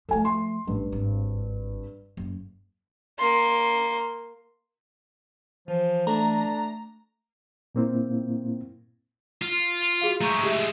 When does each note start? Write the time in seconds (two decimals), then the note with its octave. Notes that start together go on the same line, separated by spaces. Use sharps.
0.09 F3 A3 A4 G#5
0.25 C6
0.67 A1 G2
0.92 G#1
2.17 F#1
3.18 A#3 C6
5.68 E3 F3
6.07 A3 D4 A#5
7.75 A#2 A#3 C4 E4
9.42 F4
10.01 F#4 G#4 F5
10.21 G#3 A3 A#5 C#6 G6
10.43 G4 G#4 E5